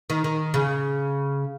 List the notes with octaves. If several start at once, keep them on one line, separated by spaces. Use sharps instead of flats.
D#3
D#3
C#3